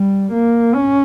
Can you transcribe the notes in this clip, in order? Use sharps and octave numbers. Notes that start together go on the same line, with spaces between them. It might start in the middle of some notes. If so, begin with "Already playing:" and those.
Already playing: G3
A#3
C#4